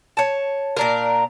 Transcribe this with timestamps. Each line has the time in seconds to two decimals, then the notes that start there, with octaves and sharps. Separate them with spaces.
0.17 C#5 A5
0.77 A#2 D4 A#4